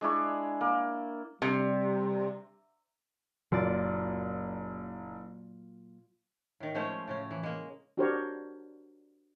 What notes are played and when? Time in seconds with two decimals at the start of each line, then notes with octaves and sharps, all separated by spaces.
0.01 G#3 D4 E4 C#6
0.61 A#3
1.42 C3 G3
3.52 F#1 A#2 F#3 F4 D5
6.60 A2 D#3
6.74 F3 G#3 A3 C#4 C5 C#5
7.07 A2 C#3 C#4
7.31 E3
7.43 G#3 A#3
7.97 D4 F#4 G4 A#4 C5 C#5